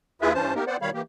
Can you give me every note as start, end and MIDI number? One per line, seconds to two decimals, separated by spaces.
0.22 0.33 39
0.22 0.33 64
0.22 0.33 65
0.22 0.33 68
0.22 0.33 71
0.22 0.33 76
0.34 0.54 43
0.34 0.54 52
0.34 0.54 61
0.34 0.54 72
0.34 0.54 81
0.55 0.65 58
0.55 0.65 59
0.55 0.65 63
0.55 0.65 67
0.55 0.65 70
0.67 0.77 59
0.67 0.77 60
0.67 0.77 72
0.67 0.77 74
0.67 0.77 78
0.82 0.90 47
0.82 0.90 51
0.82 0.90 55
0.82 0.90 73
0.82 0.90 77
0.82 0.90 83
0.94 1.02 52
0.94 1.02 58
0.94 1.02 67